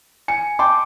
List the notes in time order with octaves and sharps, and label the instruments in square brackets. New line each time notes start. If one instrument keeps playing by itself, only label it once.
[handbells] G#5 [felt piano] C#7
[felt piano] G5 A5 C6 [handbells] D6